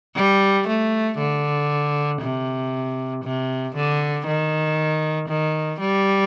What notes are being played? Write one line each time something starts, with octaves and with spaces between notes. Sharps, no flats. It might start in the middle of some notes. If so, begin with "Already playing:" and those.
G3
A3
D3
C3
C3
D3
D#3
D#3
G3